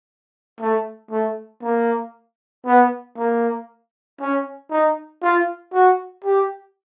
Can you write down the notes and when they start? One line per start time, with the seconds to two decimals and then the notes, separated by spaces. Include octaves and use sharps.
0.60 A3
1.11 A3
1.62 A#3
2.66 B3
3.17 A#3
4.20 C#4
4.70 D#4
5.22 F4
5.73 F#4
6.24 G4